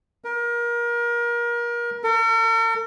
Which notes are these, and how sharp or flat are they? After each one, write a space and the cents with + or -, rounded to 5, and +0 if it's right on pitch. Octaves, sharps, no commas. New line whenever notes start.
A#4 +30
A#4 -45